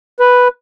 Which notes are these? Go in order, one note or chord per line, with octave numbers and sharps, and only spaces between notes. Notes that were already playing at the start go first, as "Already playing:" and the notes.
B4